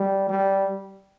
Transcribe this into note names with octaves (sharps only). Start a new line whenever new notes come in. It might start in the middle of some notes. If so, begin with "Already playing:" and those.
Already playing: G3
G3